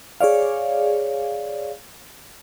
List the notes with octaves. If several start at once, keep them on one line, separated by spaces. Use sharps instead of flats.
G#4 C#5 D5 F5